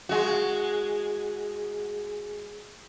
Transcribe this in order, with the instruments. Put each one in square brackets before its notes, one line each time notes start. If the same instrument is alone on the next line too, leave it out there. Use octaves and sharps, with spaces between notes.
[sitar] G#3 F#4